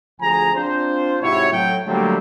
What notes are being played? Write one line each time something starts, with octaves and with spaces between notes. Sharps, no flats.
D2 F3 G#4 G#5 A#5
C4 D4 F4 C5
G#2 C3 E4 F#4 C#5
A2 F#3 G5
D3 F#3 G3 A3 A#3 C4